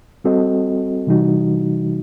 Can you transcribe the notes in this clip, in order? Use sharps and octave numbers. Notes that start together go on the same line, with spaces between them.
G3 C4 F#4 A4 D#5
C3 E3 G3 D#4 F#4